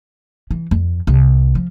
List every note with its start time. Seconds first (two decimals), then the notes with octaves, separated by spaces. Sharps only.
0.51 E3
0.71 F2
1.07 C2
1.55 F3